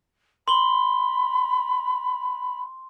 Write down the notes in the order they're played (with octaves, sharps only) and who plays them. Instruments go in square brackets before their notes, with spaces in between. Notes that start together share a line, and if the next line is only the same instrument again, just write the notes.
[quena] B5 [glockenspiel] C6 G7